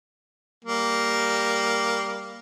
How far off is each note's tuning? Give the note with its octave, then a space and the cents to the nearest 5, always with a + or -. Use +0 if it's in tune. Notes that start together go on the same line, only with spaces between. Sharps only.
G3 +0 A#3 +0